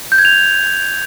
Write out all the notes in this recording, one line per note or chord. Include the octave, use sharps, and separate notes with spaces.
G6
G#6
F7